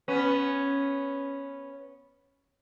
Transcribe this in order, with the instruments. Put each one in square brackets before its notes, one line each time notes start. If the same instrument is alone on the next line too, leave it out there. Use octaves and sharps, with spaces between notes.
[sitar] B3 C#4